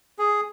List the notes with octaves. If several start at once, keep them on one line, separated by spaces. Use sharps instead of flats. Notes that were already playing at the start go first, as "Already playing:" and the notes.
G#4